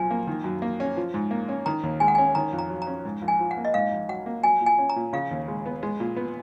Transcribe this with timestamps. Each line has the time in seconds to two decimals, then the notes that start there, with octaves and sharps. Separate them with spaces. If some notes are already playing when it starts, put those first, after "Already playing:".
Already playing: B1 F3 G#5
0.10 A#3
0.27 D#3
0.44 F#2
0.62 A#3
0.80 C#4
0.97 F3
1.14 G#2
1.31 A#3
1.49 C#4
1.66 D#3 A#5
1.83 D#2
2.00 G#3 G#5
2.08 F#5
2.15 C#4 G#5
2.35 D#3 A#5
2.53 F2
2.59 A#5
2.70 F#3
2.82 A#5
2.87 C#4
3.05 G#2
3.22 A#1
3.28 G#5
3.40 F3
3.51 F#5
3.57 A#3
3.65 D#5
3.74 G#2 F5
3.92 A#1
4.08 F#3 F#5
4.26 A#3
4.43 F#3 G#5
4.61 A#2
4.66 G#5
4.78 C#4
4.89 A#5
4.96 A#2
5.13 C#3 F5
5.31 D#2
5.48 G#3
5.66 B3
5.83 G#3
6.00 A#2
6.16 B3